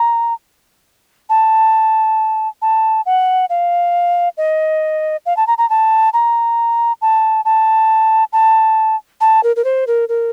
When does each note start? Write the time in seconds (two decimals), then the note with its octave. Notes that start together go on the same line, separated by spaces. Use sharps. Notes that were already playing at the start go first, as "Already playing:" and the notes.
Already playing: A#5
1.29 A5
2.62 A5
3.06 F#5
3.50 F5
4.37 D#5
5.26 F5
5.37 A5
5.47 A#5
5.58 A#5
5.70 A5
6.13 A#5
7.02 A5
7.45 A5
8.33 A5
9.21 A5
9.43 A#4
9.56 A#4
9.64 C5
9.87 A#4
10.09 A#4